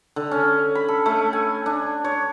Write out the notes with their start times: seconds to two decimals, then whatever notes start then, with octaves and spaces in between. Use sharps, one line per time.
0.16 D3
0.31 C#4
0.75 B5
0.88 A4
1.06 A3
1.33 G#5
1.66 D4
2.05 C#5